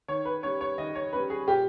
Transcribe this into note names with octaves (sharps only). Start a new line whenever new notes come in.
D#3 C#5
B4
G3 C#4 C#5
C#5
D#3 D#5
C#5
G3 C#4 B4
G#4
A#2 G4